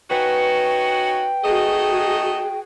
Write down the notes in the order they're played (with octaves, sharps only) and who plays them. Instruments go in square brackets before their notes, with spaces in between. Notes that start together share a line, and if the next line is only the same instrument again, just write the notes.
[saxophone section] C#4 D#4 F#4 [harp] B4 G#5 [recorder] G5
[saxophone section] A3 D#4 D#5 [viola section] F#4 G#4